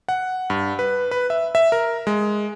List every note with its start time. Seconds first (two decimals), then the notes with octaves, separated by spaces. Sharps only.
0.09 F#5
0.50 G2
0.79 B4
1.11 B4
1.30 E5
1.55 E5
1.72 A#4
2.07 G#3